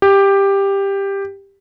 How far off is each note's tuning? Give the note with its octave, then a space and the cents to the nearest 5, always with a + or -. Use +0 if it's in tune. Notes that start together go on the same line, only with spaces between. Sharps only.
G4 +10